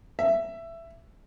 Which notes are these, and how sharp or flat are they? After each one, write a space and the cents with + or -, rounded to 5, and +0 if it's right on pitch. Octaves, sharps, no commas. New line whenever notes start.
E5 +15